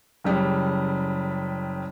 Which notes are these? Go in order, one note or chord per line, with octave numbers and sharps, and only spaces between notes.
F#1 C#3 G3